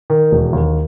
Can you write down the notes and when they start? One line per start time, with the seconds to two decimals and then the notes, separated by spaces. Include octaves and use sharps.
0.10 D#3
0.31 E1
0.53 D#2